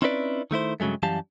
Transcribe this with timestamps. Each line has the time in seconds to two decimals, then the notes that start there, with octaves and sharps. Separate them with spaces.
0.02 C4 C#4 D#4 E4 B4 D5
0.51 D#3 A3 E4 C5
0.80 G2 C#3 F#3 G#3 A3
1.03 F#2 E3 G3 G4 F5 A5